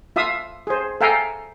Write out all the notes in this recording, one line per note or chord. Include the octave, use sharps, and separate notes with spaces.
F4 E5 F5 D#6
G#4 C5
A4 E5 F5 G5 G#5 A#5